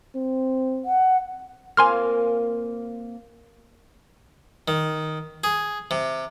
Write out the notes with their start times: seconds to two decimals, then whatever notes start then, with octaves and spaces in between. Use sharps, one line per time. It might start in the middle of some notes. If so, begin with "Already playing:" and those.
0.15 C4
0.85 F#5
1.77 A#3 C4 F4 G#5 C6 F6
4.68 D#3
5.44 G#4
5.91 C3